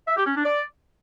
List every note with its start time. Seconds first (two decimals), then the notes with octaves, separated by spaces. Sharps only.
0.08 E5
0.17 G4
0.26 C#4
0.36 D4
0.45 D5